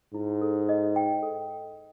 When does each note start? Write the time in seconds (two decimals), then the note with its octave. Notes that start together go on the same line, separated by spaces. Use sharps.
0.14 G#2 E4
0.41 A4
0.69 D#5
0.96 G5
1.22 A4